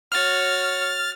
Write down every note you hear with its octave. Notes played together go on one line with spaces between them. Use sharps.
F#4 C#5 F6 A6